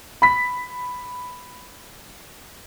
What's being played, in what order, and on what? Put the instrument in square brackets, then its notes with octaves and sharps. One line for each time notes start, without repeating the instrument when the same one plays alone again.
[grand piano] B5 B6